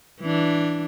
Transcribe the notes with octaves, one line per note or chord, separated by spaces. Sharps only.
E3 D4